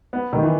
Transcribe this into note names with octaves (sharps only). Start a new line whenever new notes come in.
B3
D#3
E3